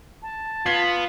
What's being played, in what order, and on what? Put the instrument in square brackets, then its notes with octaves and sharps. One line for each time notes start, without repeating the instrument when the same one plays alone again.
[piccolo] A5
[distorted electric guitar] B3 B4 [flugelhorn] F4 [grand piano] G#6 C7